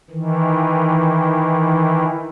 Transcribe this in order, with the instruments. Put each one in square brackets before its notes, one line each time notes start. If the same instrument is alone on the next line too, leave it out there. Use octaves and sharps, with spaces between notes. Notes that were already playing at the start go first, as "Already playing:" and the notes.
[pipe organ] D#3 E3